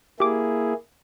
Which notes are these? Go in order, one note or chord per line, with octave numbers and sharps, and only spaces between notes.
A#3 E4 G4 G#4 D6